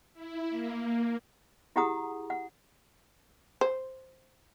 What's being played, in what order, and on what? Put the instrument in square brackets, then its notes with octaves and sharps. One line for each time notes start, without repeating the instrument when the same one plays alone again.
[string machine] E4
A#3
[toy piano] E4 G4 G#4 F#5 A#5 D#6
F#5
[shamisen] C5